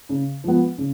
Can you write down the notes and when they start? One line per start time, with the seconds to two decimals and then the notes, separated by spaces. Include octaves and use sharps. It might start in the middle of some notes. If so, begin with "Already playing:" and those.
0.09 C#3
0.44 F3 G#3 B3
0.78 C#3